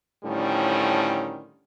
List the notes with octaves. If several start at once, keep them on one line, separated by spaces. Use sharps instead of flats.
A2 D3 D#3 F3 G3 C#4